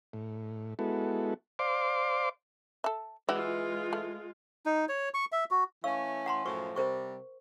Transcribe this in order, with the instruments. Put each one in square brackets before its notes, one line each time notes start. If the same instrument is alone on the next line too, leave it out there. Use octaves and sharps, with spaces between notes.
[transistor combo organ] A2
G#3 B3 E4 F#4 A4
C5 D5 F5 C6 D6
[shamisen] A4 E5
[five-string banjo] E3 [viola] G#3 F4 [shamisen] F#4 D5 E5
[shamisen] A3
[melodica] D#4
C#5
C#6
E5
F#4
[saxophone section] E3 A3 C#4 [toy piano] F5 C#6 E6
[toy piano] F#5 A#5 C6
[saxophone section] F#2 A2 F3 [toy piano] C#6
[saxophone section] C3 G3 [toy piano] A#4 C5 C#6